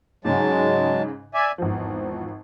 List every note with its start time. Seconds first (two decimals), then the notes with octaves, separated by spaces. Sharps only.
0.25 G#2 C#3 F#3 G#3 A5
1.34 D5 E5 G#5
1.58 G#1 E2 F3